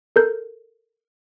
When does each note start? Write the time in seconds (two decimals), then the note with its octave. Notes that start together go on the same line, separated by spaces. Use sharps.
0.16 A4 A#4 G6